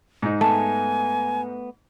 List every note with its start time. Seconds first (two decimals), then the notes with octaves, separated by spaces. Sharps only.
0.22 G#2 D#4
0.41 A3 B3 G#5 A5